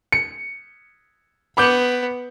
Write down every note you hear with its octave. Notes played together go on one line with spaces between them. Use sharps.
C#7
B3 B5 D6 G6